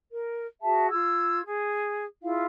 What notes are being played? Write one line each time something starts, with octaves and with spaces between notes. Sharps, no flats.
A#4
F#4 G#4 E5 A5
F4 E6 G#6
G#4
E4 F4 G#4 F5